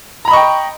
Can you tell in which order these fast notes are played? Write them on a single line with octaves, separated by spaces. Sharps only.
A#5 B5 D#5 C#6 G5